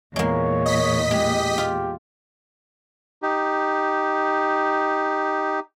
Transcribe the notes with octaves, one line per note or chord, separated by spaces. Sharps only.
E2 A#2 G#3 A#3 C#5
D#5 B6
G#3 G4
F4
D#4 G4